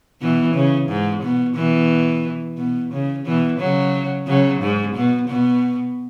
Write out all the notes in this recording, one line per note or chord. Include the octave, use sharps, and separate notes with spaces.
B2 E3
C#3
G#2
B2
B2 E3
B2
C#3
B2 E3
C#3 F#3
C#3 F#3
G#2
B2
B2